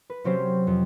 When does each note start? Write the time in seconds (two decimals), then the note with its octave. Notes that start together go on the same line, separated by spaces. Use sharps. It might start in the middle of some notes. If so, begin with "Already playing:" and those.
0.10 B4
0.24 C3 F#3 C4 C#4 G4 C5
0.67 F2